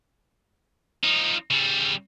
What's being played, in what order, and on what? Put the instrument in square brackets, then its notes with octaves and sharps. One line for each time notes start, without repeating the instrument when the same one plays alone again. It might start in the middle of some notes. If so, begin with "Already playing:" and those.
[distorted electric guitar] F3 D#4
C#3 G3